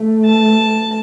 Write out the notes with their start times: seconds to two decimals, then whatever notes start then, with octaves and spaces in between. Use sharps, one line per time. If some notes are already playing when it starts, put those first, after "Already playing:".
Already playing: A3
0.25 A5